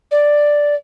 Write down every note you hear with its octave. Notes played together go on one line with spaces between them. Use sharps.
D5